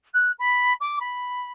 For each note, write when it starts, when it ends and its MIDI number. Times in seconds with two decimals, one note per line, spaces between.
0.13 0.31 90
0.39 0.73 83
0.80 0.97 86
1.00 1.51 83